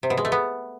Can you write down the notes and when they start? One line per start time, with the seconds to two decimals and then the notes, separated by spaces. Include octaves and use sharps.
0.03 C3
0.10 B2
0.17 G#3
0.25 A3
0.32 B3